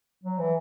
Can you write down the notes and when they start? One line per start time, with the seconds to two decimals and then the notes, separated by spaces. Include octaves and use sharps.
0.24 F#3
0.39 E3